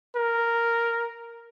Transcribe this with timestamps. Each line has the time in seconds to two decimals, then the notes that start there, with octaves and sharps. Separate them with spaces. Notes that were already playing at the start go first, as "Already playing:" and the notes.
0.15 A#4